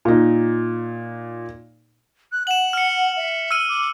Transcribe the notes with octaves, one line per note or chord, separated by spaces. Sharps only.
A#2 D#4
F#6
F#5 E7 F#7
F6 C#7
E5
E6 F6 D#7
D6